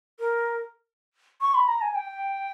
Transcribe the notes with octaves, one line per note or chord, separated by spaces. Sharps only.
A#4
C#6
B5
A#5
G#5
G5